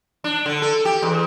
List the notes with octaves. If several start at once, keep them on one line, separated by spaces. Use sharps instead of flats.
D4
D3
A4
G4
E2